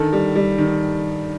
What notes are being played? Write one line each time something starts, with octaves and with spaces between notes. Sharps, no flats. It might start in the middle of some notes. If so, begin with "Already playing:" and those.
Already playing: D3 D#3 A4
G3
G3
D#3